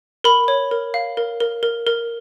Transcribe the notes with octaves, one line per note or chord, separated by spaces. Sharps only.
A#4 B5
C#5
A#4
F5
A#4
A#4
A#4
A#4